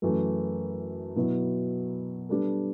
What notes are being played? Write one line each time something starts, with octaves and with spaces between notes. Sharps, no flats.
F#2 E3 A3
B2 F#3 B3 E4
G3 B3 D4 A4